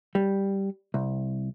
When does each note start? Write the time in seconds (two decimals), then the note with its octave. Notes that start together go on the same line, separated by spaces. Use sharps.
0.15 G3
0.94 C2